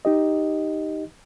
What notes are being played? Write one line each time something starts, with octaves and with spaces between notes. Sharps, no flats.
D#4 G4 D#5